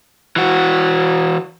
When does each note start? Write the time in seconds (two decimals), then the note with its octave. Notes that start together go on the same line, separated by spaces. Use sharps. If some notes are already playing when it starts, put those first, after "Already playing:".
0.36 E3 F#4